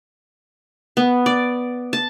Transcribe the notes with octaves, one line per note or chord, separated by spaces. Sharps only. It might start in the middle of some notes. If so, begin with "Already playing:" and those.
B3
D5
A5